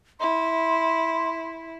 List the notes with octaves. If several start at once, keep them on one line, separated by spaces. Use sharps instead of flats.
E4 C6